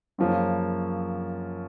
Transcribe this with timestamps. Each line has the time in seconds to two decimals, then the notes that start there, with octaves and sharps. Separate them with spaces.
0.18 F#2 C#3 F3 A#3